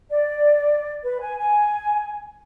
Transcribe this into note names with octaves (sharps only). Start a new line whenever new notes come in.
D5
B4
G#5
G#5